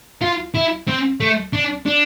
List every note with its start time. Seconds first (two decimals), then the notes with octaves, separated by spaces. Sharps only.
0.22 F4
0.54 E4
0.88 C4
1.20 A3
1.53 D4
1.86 D4